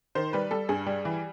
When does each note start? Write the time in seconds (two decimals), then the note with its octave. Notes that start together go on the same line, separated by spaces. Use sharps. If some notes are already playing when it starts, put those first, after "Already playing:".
0.15 D#3 C5
0.33 G3 B4
0.51 G3 A4
0.69 G2 G#4
0.86 G3
1.05 E3